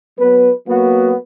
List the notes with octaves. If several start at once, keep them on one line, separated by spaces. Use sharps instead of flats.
F#3 B3 B4
F#3 A#3 B3 F#4